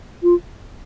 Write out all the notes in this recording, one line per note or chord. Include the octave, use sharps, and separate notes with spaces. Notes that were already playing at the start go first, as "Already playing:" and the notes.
F4